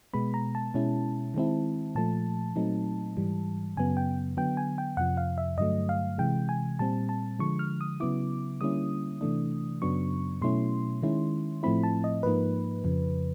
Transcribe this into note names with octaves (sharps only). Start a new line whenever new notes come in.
B2 G#3 B3 B5
A#5
A5
B2 G#3 C#4 E4
D#3 G#3 C4 E4
A#2 F3 A3 A5
A#2 F#3 A3 C4 D#4
G#2 E3 G3
F#2 C#3 F#3 B3 G#5
G5
D3 F#3 B3 G5
G#5
G5
F2 C3 F3 F#5
F5
E5
G2 D3 F#3 A3 D#5
F5
C3 E3 G#3 G5
G#5
A#2 G3 C4 A5
A5
D3 F3 G#3 C#6
F6
D#6
C#3 F#3 B3 E4 D6
D3 G3 A#3 C#4 E4 D#6
C3 E3 A3 D4
F#2 C#3 F#3 B3 D4 C#6
B2 F#3 A3 C#4 E4 C6
D#3 G#3 C#4 E4
A2 F3 A3 C4 E4 B5
A5
D#5
G#2 F3 A#3 D#4 B4
F2 C#3 F3